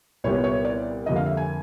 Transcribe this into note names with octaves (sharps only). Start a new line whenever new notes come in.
C2 A#2 G3 B3 C#5
C#5
D5
F2 D3 G3 A#3 D#5
F5
E5
G#5